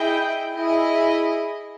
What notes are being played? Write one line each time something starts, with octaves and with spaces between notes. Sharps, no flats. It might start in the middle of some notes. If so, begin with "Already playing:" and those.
Already playing: E4 G#4 D#5 G5
E4 G#4 D#5